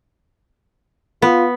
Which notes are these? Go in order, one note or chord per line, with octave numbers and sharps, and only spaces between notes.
B3 F4